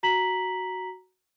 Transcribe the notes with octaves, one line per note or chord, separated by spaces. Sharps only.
F#4 A#5 B6 F#7